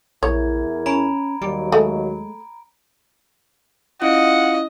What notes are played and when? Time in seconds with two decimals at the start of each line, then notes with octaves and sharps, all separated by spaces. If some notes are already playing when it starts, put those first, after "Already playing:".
0.23 A#1 E2 E4 A#4 C#5 G#6
0.86 C#4 A#5 B5 D7
1.42 D#2 F#3 G3 D7
1.72 G#3 A3
4.02 C#4 E4 F4 D#5 F#5